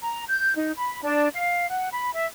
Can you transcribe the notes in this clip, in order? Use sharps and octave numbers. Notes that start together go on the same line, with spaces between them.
A#5
G6
D#4
B5
D4
F5
F#5
B5
E5